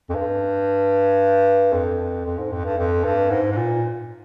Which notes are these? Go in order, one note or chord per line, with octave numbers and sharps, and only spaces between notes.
F2
G2
F2
F2
G#2
F2
G2
F2
G2
G#2
G#2
A#2